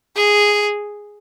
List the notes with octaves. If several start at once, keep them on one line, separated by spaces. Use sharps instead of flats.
G#4